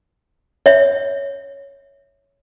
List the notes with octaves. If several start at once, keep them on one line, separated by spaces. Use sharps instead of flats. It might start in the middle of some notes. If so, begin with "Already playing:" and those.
C#5 E5